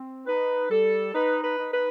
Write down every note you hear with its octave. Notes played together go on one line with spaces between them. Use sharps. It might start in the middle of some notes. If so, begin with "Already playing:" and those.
Already playing: C4
D#4 B4
G3 A4
D#4 B4
B4
D#4
B4